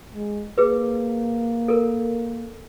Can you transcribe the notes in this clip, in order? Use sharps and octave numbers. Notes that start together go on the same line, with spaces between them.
G#3
A#3 G#4 B4
A4 A#4